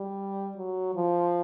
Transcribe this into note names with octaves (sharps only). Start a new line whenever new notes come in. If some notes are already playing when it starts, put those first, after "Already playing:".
Already playing: G3
F#3
F3